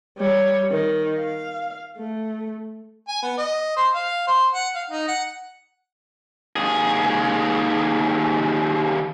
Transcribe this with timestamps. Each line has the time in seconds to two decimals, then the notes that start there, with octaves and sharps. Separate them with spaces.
0.18 G3 C#5
0.71 D#3
1.19 F5
1.98 A3
3.08 G#5
3.23 B3
3.38 D#5
3.77 C5
3.95 F5
4.27 C5
4.54 F#5
4.75 F5
4.90 D#4
5.08 F#5
6.56 D#2 G#4